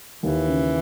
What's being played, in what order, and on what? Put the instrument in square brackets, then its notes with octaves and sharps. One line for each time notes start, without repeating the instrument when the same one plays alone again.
[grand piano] D#2 [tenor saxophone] E3
[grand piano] C#3